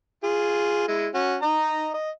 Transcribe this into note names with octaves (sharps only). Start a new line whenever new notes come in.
F4 G#4
G#3 E4
C#4 F#4
D#4 D#5 A#5
D#5